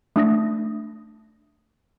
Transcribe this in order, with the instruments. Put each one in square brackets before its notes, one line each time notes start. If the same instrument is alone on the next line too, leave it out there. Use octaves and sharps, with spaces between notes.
[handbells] A3 D4 D#6 A#6